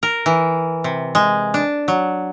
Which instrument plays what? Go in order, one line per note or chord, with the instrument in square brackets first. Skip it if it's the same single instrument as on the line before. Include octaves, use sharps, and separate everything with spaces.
[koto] A#4
E3
C3
G#3
D4
F#3